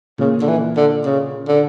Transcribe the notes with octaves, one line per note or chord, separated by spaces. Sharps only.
A#2 C#3
D3
E3
D3
C#3
D3